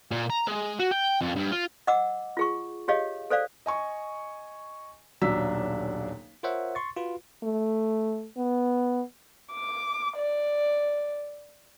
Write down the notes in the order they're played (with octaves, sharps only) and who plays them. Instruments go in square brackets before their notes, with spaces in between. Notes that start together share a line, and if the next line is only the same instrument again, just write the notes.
[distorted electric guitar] A#2
A#5
G#3
F#4
G5
F2
G2
F4
[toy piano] D#5 F#5 D6 E6
F4 G#4 C#6
G4 G#4 C#5 D#5 F5
A4 C5 D5 F5
[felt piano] D#5 G#5 C#6
D#1 B1 F#3 D4 E6 B6
[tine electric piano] F4 A#4 C5 C#5 E5 F#5
C6 C#6 A6
F4 F#4 B4
[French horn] A3
B3
[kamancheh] D6
D5